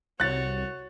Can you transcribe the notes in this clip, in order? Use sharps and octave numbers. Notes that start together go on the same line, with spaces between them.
C2 F#4 C#5 F#6 A6